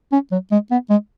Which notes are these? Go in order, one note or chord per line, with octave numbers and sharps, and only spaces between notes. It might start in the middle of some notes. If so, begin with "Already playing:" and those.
C#4
F#3
G#3
B3
G#3